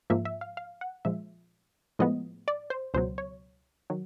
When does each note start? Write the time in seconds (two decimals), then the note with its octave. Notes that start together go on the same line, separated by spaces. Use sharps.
0.10 G#2 F3 A#3 E5
0.25 E5
0.41 F5
0.57 F5
0.81 F#5
1.05 A#2 F3 G#3 E5
1.99 A2 F3 G#3 B3 D#5
2.48 D5
2.70 C5
2.94 C#2 B2 F#3 C5
3.18 C#5
3.90 D#3 F#3